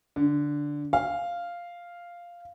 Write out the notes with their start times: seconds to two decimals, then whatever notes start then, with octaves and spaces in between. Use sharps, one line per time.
0.16 D3
0.93 F5